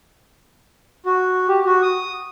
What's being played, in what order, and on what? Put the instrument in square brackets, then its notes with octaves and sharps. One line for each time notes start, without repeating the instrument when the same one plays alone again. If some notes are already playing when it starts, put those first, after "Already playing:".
[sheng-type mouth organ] F#4
G4
F#4
D#6